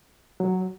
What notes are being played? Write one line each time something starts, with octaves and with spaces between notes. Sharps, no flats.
F#3